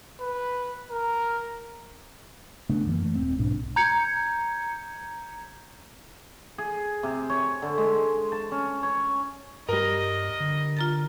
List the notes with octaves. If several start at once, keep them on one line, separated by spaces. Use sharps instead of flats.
B4
A#4
C#3 A3 B3 D4
F#2 E3 A#3
A3
D#1 C4
B1 G#2 B2 D4
A#5 G6 G#6 C#7
G#4
C3
C#5
D3
G#3
A5
C#4
C#5
G2 G3 A#4 D#5
D3
F4 A#5 A6